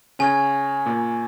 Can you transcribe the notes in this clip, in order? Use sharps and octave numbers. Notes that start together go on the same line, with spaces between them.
C#3 C#4 G#5 C#6 G#6
A#2 A#3